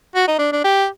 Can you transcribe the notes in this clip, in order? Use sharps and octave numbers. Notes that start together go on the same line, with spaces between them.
F#4
D#4
D4
D4
G4